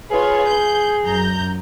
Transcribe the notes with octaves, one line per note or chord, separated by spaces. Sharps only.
F4 G#4 B4 C#5
G6
F#2 A#5 G6